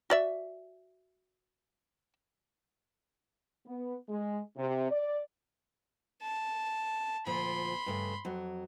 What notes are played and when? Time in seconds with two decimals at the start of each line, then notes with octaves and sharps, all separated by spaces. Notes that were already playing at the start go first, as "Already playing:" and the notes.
0.10 F#4 D5 E5
3.66 B3
4.08 G#3
4.57 C3
4.90 D5
6.22 A5
7.26 D2 A#2 F3 B5 C6
7.86 G2 C#3 A3
8.25 F2 F#3